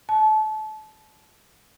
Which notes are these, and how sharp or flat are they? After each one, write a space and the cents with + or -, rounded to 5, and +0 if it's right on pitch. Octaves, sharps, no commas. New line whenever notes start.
A5 -30